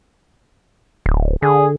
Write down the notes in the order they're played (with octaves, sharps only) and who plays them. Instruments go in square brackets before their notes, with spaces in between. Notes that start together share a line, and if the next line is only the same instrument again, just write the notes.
[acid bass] D1
[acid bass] D3 [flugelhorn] G#4